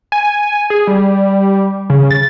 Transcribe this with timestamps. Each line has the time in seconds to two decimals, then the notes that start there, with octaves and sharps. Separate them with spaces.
0.12 G#5
0.70 G#4
0.87 G3
1.90 C#3
2.11 A6